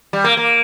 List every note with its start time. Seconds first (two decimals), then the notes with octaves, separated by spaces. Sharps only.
0.13 G3
0.24 A#3
0.37 A#3